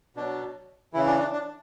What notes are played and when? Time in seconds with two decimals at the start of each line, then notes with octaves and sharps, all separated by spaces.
0.17 B2 F#3 D4
0.93 C#3 E3 E4
1.07 D4
1.19 D4
1.32 D4